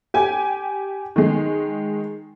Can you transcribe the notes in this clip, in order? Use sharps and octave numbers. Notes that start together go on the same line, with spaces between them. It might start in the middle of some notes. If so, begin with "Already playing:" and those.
G4 G5 G#5
D#3 G#3